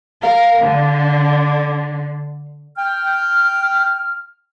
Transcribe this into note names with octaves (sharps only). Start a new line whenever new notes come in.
A#4 F5
D3
G5 F6